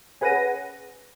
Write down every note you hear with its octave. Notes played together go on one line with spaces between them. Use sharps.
C#4 G#4 B4 F#5 A#6 D#7